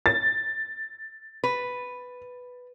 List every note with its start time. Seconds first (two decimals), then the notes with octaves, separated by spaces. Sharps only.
0.06 A6
1.44 B4